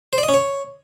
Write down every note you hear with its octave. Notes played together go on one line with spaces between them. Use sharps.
C5
D5
D#5
C#4
C#5